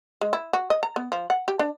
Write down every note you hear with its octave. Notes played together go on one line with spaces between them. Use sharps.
G#3
E4
F#4
D#5
A#5
B3
F3
F#5
G4
D4